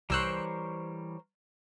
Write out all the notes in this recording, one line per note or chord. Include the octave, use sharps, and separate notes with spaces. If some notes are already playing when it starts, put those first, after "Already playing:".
C2 E3 G3 A#4 C5 C#5 E6 F#6